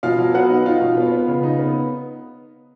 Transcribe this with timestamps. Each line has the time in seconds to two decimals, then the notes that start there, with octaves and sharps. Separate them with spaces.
0.03 B2 F4 F5
0.19 F#3
0.34 B3 F#4 F#5
0.49 D#4
0.66 D#4 F4 F5
0.81 B2
0.97 B3
1.12 B3
1.28 C#3
1.43 D#4
1.59 B3